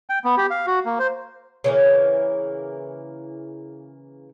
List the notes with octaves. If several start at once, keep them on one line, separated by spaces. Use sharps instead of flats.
G5
B3
G4
F5
F#4
A#3
C5
C#3 E3 A#3